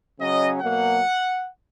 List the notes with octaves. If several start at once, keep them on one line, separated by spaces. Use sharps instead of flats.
C#3 F#3 C#4 D#5
B2 F#3 A#3 F#5